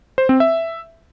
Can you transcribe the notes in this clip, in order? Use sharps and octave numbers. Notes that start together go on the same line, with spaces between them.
C5
C4
E5